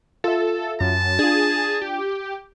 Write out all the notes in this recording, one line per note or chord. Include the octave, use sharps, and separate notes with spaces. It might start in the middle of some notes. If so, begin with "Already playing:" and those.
F4 A4 E5
F#2 A5
D4 F4 G#4
G4